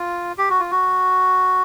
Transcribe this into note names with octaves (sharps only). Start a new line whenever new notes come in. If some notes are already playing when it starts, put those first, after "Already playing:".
Already playing: F4
G4
F#4
F4
F#4